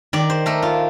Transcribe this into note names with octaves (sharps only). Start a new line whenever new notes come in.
D#3 D5
C5
A3 A#4
F4